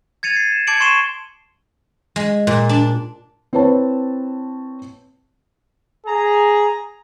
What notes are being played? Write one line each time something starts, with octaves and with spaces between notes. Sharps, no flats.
G#6 A6 C#7 D#7 F7
C7
E7
A5 D6 G#6 C#7 D7 F#7
C6 C#6 C7 D#7 E7 G7
G#3
A#2
D4
C4 E4 B4 C#5 A5
G#4 A#5